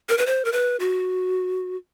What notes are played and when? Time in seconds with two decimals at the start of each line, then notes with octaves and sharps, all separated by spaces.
0.09 A#4
0.18 B4
0.26 C5
0.45 A#4
0.52 B4
0.80 F#4